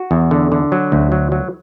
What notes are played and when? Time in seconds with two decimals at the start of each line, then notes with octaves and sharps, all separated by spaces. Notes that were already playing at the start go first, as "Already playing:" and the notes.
Already playing: F#4
0.11 E2
0.31 D3
0.52 D3
0.72 F#3
0.92 D2
1.12 F#3
1.32 F#3